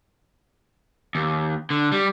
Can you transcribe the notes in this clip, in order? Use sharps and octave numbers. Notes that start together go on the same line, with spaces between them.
D#2
D3
G3